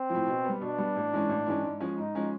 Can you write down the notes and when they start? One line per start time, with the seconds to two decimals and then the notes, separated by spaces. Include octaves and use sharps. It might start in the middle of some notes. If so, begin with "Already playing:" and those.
Already playing: C4
0.10 A2 F3
0.27 B2
0.44 G3 B3
0.60 B2 D4
0.78 G3 B3
0.96 A1
1.12 G#2 E3 G#3 C#4
1.29 A1
1.46 G#2 E3 G#3 C#4
1.64 G#2
1.80 F3 G#3 C#4
1.98 G#2 D#4
2.15 F3 G#3 C#4